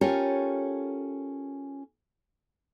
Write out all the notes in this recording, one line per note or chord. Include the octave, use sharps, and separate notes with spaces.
C#4 F4 G4 A4 A#4 C#5